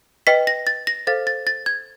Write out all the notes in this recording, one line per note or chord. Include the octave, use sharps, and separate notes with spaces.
B4 D#5 G5 B6
A#6
A6
A#6
A4 C5 F5 A6
A6
A6
G#6